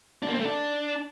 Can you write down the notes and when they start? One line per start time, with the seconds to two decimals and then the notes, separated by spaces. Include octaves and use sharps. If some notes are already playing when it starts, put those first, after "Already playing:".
0.23 D4
0.28 A#3
0.34 C4
0.39 A3
0.45 D4